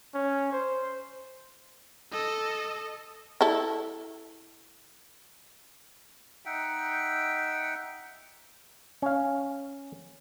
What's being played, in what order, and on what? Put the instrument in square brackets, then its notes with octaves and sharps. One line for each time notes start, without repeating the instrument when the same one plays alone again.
[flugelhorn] C#4
C5
[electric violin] A4 D#5
[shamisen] E4 A4
[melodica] D#4 E5 F#5 G5
[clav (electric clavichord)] C#4 F5